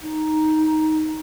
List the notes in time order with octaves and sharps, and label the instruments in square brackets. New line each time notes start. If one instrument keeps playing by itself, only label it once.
[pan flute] D#4